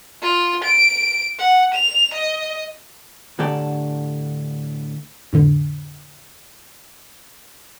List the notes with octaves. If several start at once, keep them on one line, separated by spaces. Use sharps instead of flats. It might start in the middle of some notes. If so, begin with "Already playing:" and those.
F4
D7
F#5
F7
D#5
A2 D3 G4 A4 D5
F2 A2 D3